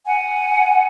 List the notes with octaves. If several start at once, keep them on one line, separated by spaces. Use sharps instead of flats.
F#5 G#5